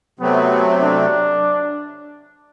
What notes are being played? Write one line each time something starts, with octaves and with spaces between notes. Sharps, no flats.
C3 F#3 A3 B3 C4
D4